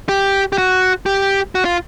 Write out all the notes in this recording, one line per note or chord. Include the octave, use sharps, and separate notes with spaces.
G4
G4
F#4
G4
F#4
F4